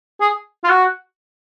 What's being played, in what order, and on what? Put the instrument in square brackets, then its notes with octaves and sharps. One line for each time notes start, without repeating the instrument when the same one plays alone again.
[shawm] G#4
F4
F#4